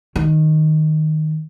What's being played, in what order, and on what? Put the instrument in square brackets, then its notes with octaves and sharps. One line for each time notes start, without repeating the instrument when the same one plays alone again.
[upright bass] D#3